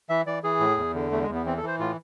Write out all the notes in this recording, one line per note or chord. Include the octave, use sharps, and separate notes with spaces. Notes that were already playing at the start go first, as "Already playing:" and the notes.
E3 E5
E3 D5
E3 G#4
A2
E2
D3
E2 A3
G#3
E2
B3
E3 C4
A4
E3 C5
A2 F4